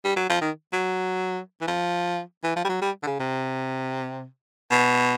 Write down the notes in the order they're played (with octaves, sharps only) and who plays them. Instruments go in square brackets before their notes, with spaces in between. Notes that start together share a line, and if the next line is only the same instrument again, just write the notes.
[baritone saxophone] G3
F#3
F3
D#3
F#3
E3
F3
E3
F3
G3
F#3
G3
D3
C#3
C3
B2